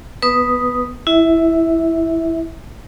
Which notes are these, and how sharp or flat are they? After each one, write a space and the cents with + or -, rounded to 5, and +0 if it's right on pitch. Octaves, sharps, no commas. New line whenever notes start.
B3 +0 B4 +0 D#6 +0
E4 +0 E5 -20